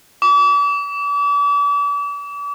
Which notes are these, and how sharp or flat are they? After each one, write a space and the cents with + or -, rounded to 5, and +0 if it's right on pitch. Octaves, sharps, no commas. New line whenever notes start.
D6 -40